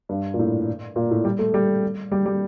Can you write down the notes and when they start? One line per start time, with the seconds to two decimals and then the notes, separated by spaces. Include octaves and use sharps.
0.09 G2
0.34 A#2
0.39 A2
0.96 A#2
1.11 A2
1.25 G3
1.39 A3
1.54 G3
2.12 G3
2.26 G3